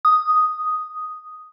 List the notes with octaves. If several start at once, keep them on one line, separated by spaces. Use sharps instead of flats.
D#6